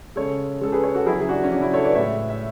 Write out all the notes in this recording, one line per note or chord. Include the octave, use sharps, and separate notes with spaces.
C#3 G#3 A4 C#5
C#3 G#3 A4
G#4 B4
A4 C#5
F#4 A4
C#3 F#3 E4 G#4
G#4
D4 F#4
C#4
C#3 F#3 D4
C#4 E4
A4 C#5
B4 D5
A2 G#3 C#5 E5
E5